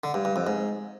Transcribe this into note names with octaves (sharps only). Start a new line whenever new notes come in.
D3
G2
G2
F2
G#2